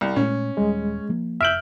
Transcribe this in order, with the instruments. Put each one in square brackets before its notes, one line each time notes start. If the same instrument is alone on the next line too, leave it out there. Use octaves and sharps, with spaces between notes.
[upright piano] C2
[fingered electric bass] A#2 G#3 A3 [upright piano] C#4
[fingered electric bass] D#1 G3 [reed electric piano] G#3
[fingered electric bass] F3 A#3
[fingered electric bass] F1 [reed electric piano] E5 G6 [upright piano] F6 D7 F#7